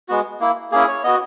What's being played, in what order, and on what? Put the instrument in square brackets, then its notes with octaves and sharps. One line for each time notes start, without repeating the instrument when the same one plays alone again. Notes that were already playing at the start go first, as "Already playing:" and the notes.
[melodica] G#3 B3 F#4
A#3 E4
A#3 C#4 E4 G#4
C#5
B3 F#4 D#5